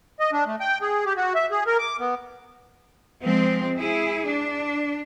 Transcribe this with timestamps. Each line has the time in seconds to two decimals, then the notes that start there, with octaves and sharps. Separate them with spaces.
0.20 D#5
0.33 D4
0.46 A3
0.60 G5
0.82 G#4
1.06 G4
1.17 F#4
1.35 E5
1.51 G#4
1.67 A#4
1.79 D6
1.99 B3
3.23 F3 G#3 C4
3.79 E4 G#4
4.27 D4